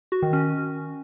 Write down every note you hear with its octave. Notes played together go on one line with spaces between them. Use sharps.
F#4
D#3
C#4